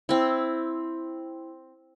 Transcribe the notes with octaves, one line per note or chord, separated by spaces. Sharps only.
C4 E4